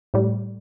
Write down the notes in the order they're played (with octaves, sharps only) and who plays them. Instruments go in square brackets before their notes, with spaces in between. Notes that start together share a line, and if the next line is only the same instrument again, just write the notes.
[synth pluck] A2 G3